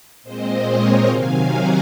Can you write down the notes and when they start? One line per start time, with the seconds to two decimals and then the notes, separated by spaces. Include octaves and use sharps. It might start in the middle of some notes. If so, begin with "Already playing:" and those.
0.23 A#2 G#3 C4 C5 D#5
0.66 A#4 C#5
1.07 C3 D#3 F#3 F5 G#5
1.48 F#5 A#5